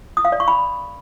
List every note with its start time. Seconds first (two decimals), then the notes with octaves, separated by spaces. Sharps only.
0.17 D#6
0.25 F5
0.32 D5
0.40 C#6
0.48 B5